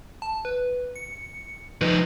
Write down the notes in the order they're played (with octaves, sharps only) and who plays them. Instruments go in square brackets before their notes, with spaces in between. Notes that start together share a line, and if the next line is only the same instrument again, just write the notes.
[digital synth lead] A5
B4
C#7
[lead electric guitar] F3 D#4 [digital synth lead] B4